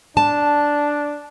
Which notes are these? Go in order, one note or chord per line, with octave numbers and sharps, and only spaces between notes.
D4 A5